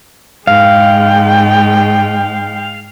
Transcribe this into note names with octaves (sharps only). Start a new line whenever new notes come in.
G#2 G#3 F5 G5